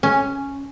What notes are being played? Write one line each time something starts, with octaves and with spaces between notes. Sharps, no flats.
C#4